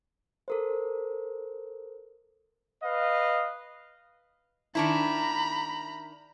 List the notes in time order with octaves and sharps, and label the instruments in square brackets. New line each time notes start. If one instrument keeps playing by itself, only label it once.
[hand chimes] A4 A#4 C5
[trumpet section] B4 D#5 F5
[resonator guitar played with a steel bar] D#3 D4 E4 [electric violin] A#5 B5